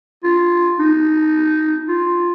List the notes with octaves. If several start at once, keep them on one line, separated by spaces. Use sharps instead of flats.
F4
D#4
F4